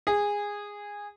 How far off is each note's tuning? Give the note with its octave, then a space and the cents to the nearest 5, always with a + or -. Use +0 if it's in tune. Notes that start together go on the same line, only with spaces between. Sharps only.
G#4 -15